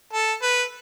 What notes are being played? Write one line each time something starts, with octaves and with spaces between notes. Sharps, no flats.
A4
B4